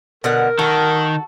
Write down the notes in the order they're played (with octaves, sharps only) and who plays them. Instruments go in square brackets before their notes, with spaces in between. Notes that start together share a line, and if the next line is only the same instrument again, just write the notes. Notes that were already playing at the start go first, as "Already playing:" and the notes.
[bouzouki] B2 D3 F#5 [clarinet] A#4
[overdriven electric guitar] D#3 [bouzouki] F#4 A4